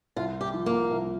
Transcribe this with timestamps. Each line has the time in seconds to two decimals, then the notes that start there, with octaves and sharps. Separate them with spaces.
0.16 C2 F4
0.41 G4
0.54 F3
0.66 A#3
0.91 C2